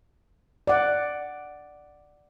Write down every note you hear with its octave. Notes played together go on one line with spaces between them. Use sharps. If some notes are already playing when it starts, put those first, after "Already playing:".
D5 F#5